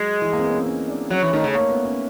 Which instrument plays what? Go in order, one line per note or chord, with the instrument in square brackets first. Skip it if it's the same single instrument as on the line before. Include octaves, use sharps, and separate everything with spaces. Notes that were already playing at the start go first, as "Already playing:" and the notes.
Already playing: [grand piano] F#3 [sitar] G#3
[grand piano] E3
A#3
C4
B3
C#4
C4
C#4
D4
[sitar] F#3 [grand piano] C#4
[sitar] E3
[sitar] D#3 [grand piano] A3
[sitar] C#3
[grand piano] A#3
B3
C#4